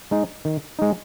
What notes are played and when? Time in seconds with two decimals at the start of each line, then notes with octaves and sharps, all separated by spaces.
0.11 G#3 D#4
0.45 D#3
0.79 G#3 D#4